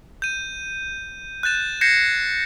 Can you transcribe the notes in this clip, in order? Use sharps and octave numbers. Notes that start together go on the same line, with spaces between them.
G6 D#7
F#6 G6 A6 E7
G6 G#6 A#6 C7 C#7 E7